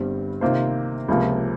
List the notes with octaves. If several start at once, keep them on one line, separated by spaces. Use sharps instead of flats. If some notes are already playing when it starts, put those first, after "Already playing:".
Already playing: G1 G2 G3 C4
C3 D#3 A#3 F4 C5
C#2 C3 F3 A#3